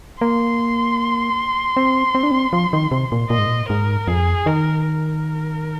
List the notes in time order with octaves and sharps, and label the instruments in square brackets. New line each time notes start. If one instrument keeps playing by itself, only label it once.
[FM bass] A#3 [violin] C6
[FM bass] C4
C4
D4
C4
F3
D#3
C3
A#2
[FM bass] A#2 [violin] D#5
[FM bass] G#2
A#2
[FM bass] G#2 [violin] A#4
[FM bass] F2 [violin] G#4
[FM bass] D#3 [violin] A#4
[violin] A#4